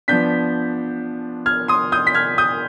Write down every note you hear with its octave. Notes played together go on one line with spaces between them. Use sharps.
F3 B3 D4 G6 B6
F6 G#6
C6 D#6
D#6 G6
B6
F6 G#6
D#6 G6